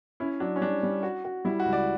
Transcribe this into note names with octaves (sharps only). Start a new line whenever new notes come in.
C#4 E4
F#3 D4
C#4
G3 D4
G3
F#4
F#4
G3 E4
F#4
C#2
D5